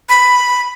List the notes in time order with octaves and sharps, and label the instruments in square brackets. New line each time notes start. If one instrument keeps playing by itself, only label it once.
[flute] B5